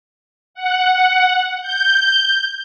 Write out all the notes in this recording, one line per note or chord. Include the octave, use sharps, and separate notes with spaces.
F#5
G6